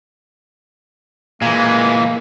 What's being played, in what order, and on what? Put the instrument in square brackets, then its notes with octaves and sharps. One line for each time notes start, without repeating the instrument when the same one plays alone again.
[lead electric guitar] A#2 E3 [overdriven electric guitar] G#3 [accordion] A#3